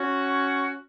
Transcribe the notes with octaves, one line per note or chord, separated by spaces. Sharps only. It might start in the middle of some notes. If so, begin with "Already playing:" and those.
Already playing: C#4 F#4